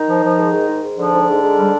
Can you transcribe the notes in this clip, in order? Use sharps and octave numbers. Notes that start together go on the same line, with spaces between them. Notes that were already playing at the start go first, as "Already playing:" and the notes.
Already playing: D#3 D#4
F3
F3
G#2
G#2
G#2
G#2
D3 F3 D4
G#2
G#2
G#2
G3